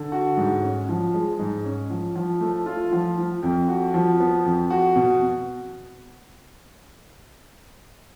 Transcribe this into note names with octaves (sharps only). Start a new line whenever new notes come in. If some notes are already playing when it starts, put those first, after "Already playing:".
Already playing: D3
F#4
G#2
C#4
F3
G#3
G#2
C#4
F3
F3
A3
F4
F3
F3
F2
F#4
F3
B3
F2
F#4
B2